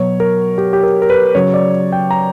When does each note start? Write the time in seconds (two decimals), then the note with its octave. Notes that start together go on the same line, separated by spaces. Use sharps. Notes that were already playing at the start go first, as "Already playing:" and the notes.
Already playing: B2 F#3 C#5
0.20 A#4
0.58 G4
0.73 G4
0.83 A#4
1.02 A#4
1.10 B4
1.35 C#3 F#3 C#5
1.54 D5
1.93 G5
2.11 A#5